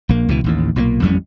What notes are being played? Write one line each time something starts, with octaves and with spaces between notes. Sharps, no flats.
A#1 A#3
C#2 B2 E3
A1 D#2 A2
B1 A#2 G3 A#3
A1 F2 G3 C#4